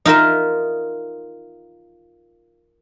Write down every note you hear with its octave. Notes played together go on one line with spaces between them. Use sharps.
D#4 F4 A#4 E5